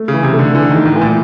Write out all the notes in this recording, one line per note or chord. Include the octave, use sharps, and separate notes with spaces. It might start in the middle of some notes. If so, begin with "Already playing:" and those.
Already playing: A3
C#3 E3
C3
D3 A3
D3 E3
D#3
A3
A2
A2 E3
A#2